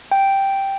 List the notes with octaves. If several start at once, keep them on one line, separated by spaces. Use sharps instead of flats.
G5